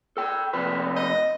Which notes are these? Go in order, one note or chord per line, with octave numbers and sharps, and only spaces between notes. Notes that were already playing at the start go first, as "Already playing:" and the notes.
A4 G5
F2 C3 B4
D#5